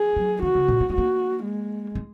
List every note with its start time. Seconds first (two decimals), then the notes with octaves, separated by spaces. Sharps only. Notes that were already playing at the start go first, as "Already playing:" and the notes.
Already playing: G#4
0.17 F#3
0.42 D#3 F#4
0.55 C#3
0.68 A#2
0.80 A#3
0.90 G#3
0.93 A#3 F#4
1.44 G#3
1.95 G#3